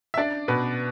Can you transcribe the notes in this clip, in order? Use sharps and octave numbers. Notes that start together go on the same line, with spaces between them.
E5
D4 D5
B2 B4